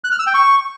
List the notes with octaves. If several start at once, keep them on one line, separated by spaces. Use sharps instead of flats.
F#6
F6
E6
G5
C#6